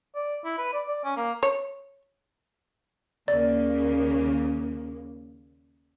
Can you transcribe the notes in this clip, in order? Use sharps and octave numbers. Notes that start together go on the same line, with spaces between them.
D5
E4
B4
D5
D5
C#4
A#3
C#5
D#2 C#3 A#3 D5